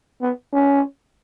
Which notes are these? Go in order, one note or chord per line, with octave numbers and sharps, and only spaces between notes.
B3
C#4